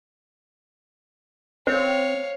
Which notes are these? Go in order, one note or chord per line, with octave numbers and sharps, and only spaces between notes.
C4 C5 C#5 F5